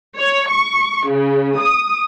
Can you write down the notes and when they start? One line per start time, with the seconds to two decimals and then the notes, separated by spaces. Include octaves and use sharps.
0.17 C#5
0.48 C#6
1.09 C#3
1.59 D#6